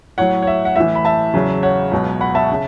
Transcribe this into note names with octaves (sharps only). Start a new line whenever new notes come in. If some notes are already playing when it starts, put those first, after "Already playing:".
A2 F#3 C#5 F#5
C#5
E5
F#5
A2 E3 E5
B5
E5 A5
E2 C#3 F#3
C#5 F#5
C#2 B2 F#3
F#5 B5
E5 A5
C#3